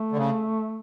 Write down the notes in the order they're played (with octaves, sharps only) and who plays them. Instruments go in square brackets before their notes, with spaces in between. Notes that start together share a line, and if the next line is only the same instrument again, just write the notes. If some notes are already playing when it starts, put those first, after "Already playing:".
Already playing: [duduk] A3
[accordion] D3
C#3